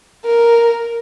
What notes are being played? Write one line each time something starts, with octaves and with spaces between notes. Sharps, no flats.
A#4